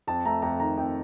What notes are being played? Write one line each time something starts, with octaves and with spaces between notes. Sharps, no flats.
F2 A5
A3 A#5
F2 A#5
D#3 A#5
F2 G5